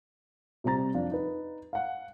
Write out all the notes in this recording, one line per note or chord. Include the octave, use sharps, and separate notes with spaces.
C3 G3 C4 A#5 A6
F2 D4 F5
D#4 B4
F5 F#5